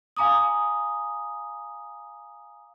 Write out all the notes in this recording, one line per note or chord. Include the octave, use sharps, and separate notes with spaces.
F5 G#5 A#5 D6 D#6